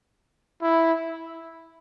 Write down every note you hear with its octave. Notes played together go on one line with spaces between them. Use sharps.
E4